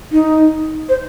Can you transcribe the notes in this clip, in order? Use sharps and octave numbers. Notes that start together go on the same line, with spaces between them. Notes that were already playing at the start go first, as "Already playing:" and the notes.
D#4
C5